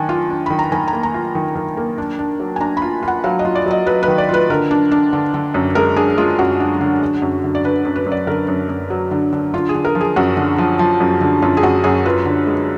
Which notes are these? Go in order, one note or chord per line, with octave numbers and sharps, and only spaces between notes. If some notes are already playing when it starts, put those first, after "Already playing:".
Already playing: D#3 D4 G#5
F4
D4
D#3 B5
A#5
D#3 G#5
A#5
A#3
A#5
F4
D#3
D#3
A#3
D4
D4
F#3
G#5
D4 A#5
B5
F4
F4
F#5
F#3 F5
D#5
F4
D5
F#3 D#5
F#3 B4
B4
D#3
D5
F4 B4
D3 A#4
D4
D4
D3
D3
F#2
G#3 A#4
D4 G#4
G#3 F4
F#2 F#4
D4
D3
D3
F#2
D3
D5
D3 B4
F#2
B4
F#2
D5
D3 A#4
F#2
F#2
F#3
D3
D3
D3 F4
G#4
D3
A#4
F3
G#4
F#2 F#4
D3
F3
F3
F#2
D3
F#2 F4
G#4
F#2 F#4
F#2 G#4
F4 B4
D3
G#3